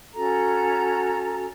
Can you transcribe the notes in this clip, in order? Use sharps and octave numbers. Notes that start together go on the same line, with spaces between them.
C#4 F#4 A4 A#5